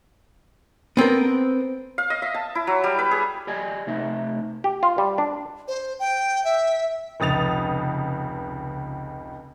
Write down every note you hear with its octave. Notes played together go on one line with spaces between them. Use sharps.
B3 C4 A4 A#4
F5
D#5
E5
A5
E4
F#3
G3
B4
G#4
G4 D5 D#5 G#5
C3 A3 D#4 D#5 E5
G4
F4
G3
D4
C5
G5
E5
F1 C#2 D#6 A6 F7